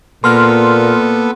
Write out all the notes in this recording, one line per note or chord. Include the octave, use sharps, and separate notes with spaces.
A#2 A#3 B3 A4 B4 C6 F6